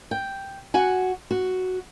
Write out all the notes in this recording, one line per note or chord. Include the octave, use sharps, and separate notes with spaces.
G5
F#4 F#5 G#5
F#4